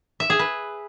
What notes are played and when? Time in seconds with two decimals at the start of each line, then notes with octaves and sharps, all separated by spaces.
0.20 E5
0.30 G#4
0.39 B4